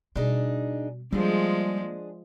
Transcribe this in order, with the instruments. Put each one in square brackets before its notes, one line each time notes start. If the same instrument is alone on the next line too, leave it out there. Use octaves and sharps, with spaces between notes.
[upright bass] B2 G3 [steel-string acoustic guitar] D4 D#4 G#4
[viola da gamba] F3 G#3 [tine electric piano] G3 [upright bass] A#3 [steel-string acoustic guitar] D4 G#4